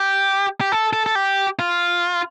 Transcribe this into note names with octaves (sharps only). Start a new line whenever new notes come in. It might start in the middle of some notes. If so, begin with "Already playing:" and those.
Already playing: G4
G4
A4
A4
A4
G4
F4